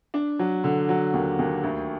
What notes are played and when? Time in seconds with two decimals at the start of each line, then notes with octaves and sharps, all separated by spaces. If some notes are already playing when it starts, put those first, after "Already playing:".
0.14 D4
0.39 F#3
0.64 D3
0.89 F#3
1.13 D#2
1.39 D#2
1.63 D2